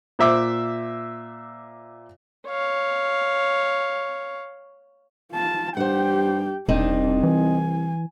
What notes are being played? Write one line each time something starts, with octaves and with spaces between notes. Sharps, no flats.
A#2 C5 E5 D6
C#5 F5
F4 A5
G2 G4 C5 F#5 G5
E1 C2 C4 D4 D#4 D#5
E3 G#5